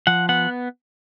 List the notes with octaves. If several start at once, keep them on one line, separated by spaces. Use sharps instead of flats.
F3 F#5
B3 F#5